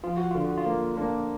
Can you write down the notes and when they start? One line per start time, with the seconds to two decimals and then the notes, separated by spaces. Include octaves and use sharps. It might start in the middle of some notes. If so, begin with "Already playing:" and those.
0.03 F3 F4
0.17 F#4
0.31 D3 F4
0.44 F#4
0.57 F4
0.66 A#3
0.97 A#3 D4